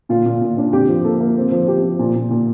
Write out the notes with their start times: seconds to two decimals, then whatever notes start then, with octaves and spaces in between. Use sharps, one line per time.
0.09 A#2 F4
0.25 A#2
0.41 A#2
0.57 D4
0.73 F2 G4
0.88 F3
1.04 A#3 A4
1.20 A#3
1.36 C4
1.52 F3
1.68 C4 G4
1.83 F3
1.99 A#2
2.15 A#2
2.31 A#2